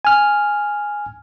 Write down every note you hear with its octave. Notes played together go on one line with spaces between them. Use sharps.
G#5 F6